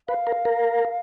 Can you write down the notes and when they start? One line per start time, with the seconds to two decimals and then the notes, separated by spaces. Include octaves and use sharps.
0.08 B4 F5
0.27 A#4
0.45 A#4